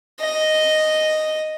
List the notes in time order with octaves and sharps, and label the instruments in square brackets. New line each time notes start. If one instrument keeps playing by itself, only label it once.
[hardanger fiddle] D#5